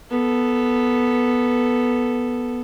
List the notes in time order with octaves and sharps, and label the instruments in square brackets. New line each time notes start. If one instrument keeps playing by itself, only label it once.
[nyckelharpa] B3 A4